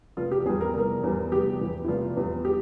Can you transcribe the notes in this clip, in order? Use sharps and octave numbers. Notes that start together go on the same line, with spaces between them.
F1 F4
G4
E2 E3 G3 G#4
A#4
F1 A#4
E2 E3 G3
F1 G4
E2 E3 G3
E4
F1 F4
E2 E3 G3
G4